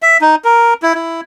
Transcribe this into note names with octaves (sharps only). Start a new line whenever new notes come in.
E5
D#4
A#4
E4
E4